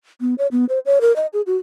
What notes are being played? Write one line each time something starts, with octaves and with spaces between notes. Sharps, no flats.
B3
C#5
B3
C5
C#5
A#4
D#5
G#4
F#4